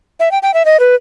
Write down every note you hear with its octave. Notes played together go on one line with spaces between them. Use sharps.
E5
G5
G5
E5
D#5
B4